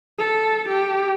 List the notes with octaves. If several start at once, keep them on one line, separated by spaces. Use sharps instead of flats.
A4
G4